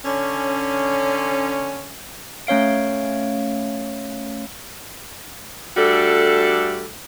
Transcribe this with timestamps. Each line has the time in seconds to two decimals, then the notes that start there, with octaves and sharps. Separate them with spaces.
0.05 D3 C#4
2.47 A3 C#4 C#5 F5 D7
5.77 G3 A3 D4 F#4 A4